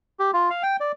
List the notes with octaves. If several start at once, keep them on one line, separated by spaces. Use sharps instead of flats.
G4
F4
F5
G5
D5